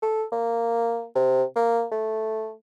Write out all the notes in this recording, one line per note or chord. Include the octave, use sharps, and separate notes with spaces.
A4
A#3
C3
A#3
A3